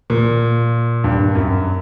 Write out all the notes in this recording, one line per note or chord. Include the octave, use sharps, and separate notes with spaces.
A#2
G2
F#2